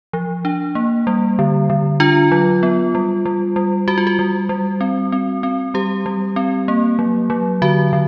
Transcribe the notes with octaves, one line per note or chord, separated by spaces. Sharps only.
F3
D4
A#3
G3
D3
D3
D4 F4
F#3
B3
G3
G3
G3
G3 F#4
F4
F#4
G3
G3
C4
C4
C4
G3 G4
G3
C4
A#3
F#3
F#3
D3 F#4
D3